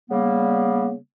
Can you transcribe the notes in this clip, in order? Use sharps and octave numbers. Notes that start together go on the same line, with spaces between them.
C#3 G3 A#3 B3